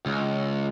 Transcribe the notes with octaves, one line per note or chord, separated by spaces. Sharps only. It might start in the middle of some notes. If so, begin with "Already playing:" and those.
C#2